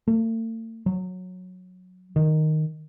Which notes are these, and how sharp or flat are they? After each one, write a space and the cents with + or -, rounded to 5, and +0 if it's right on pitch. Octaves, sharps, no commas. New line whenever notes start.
A3 +45
F#3 -15
D#3 -5